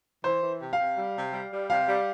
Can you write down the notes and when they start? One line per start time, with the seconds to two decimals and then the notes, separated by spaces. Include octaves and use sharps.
0.24 E3 C5
0.42 E3
0.60 C3
0.73 F5
0.79 C3
0.97 G3
1.16 C3
1.33 G3
1.52 G3
1.70 C3 F5
1.88 G3